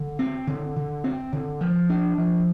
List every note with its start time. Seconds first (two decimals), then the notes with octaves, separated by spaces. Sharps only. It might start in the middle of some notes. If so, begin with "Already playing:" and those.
Already playing: D3
0.19 C4
0.47 D3
0.76 D3
1.04 C4
1.32 D3
1.61 F3
1.89 D4
2.18 F3